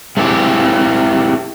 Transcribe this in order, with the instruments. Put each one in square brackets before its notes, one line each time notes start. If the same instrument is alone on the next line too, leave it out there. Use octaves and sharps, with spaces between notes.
[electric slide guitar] G#3 A3 C4 E4 G4